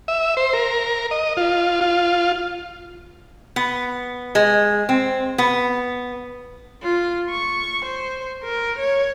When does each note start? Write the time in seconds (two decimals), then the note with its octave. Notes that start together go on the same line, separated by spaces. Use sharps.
0.08 E5
0.37 C5
0.53 A#4
1.11 D#5
1.37 F4
1.81 F4
3.56 B3
4.35 G#3
4.89 C4
5.38 B3
6.82 F4
7.30 C#6
7.85 C5
8.43 A#4
8.79 C#5